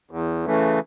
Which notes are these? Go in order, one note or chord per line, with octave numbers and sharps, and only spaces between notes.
E2
C#3 E3 A3